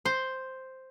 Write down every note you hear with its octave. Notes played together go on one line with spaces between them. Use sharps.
C5